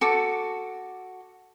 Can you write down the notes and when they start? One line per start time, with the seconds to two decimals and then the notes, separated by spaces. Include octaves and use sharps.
0.01 F#4 A4 D6